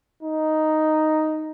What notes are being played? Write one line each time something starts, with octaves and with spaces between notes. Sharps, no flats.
D#4